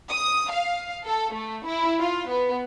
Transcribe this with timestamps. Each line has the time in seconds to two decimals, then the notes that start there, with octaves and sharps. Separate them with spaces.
0.11 D#6
0.52 F5
1.05 A4
1.34 A3
1.66 E4
2.00 F4
2.30 B3